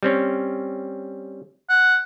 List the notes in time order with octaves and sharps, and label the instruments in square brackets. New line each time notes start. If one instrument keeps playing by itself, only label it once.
[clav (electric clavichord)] G3 C4 C#4
[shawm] F#5